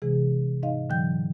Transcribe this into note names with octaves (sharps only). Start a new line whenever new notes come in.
C3 E3 G#3 G#4
G#2 D#4 D#5 F5
G#2 D3 E3 F#3 G5 G6